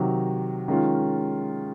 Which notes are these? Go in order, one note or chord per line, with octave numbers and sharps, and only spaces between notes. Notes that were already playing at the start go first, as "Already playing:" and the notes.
Already playing: C3 D#3 F#3
D#3 G#3 C#4 F4